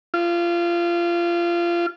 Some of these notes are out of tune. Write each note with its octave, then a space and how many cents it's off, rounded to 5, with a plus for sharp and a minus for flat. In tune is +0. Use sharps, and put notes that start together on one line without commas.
F4 -25